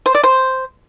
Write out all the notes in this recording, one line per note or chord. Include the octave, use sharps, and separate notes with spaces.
C5
D5
C5